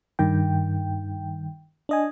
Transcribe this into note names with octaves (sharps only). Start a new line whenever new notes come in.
G2 D#3 G5
D4 D#5 G#5